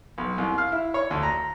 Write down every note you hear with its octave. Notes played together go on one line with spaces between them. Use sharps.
B1
C2
F5
E4
C#5
D2
A#5